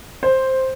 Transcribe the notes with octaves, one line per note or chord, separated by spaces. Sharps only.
C5